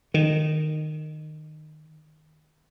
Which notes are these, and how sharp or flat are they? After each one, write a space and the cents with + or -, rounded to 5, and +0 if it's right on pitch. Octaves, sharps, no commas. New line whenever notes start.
D#3 -15